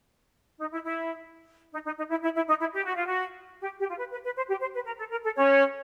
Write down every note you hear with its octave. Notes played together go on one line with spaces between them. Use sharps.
D#4
E4
E4
D#4
D#4
D#4
E4
E4
E4
D#4
E4
G4
F#4
F4
F#4
G4
G4
F4
B4
B4
B4
C5
G4
C5
B4
A#4
A4
A#4
A4
C#4 C#5